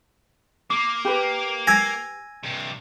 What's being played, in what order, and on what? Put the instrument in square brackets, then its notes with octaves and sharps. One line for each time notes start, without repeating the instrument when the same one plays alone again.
[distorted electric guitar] A#3 [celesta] D6
[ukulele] G4 B4
[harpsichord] G#5 [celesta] E6 G#6 A#6
[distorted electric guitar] G2 C3